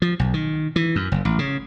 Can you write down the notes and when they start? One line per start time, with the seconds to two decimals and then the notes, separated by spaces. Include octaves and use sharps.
0.02 F3
0.19 B1
0.34 D#3
0.76 E3
0.96 F#2
1.12 F#1
1.25 A1
1.39 C#3